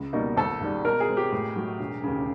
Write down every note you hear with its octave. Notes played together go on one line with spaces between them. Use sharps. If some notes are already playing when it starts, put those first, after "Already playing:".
Already playing: C#2
B2 G3 A#3 D#4
G#1 A4
G#2 D#3 G3
B2 A#4
G#4
G#3 C4
G4
A2
F#3 A3
E1
D#2 C#3